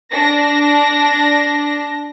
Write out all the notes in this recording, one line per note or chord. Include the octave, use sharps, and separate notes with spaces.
D4 A#6